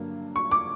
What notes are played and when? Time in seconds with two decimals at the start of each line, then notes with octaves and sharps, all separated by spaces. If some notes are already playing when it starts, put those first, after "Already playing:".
Already playing: G2 D3 F#3 A#3
0.36 C#6
0.51 D6